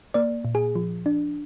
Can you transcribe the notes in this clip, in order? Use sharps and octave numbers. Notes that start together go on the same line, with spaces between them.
A#3 D5
A#2
G#4
F3
D4